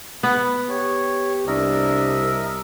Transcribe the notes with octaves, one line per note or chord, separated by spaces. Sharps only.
B3 B4
G4 C#5
C2 D4 A#4 D#5 E5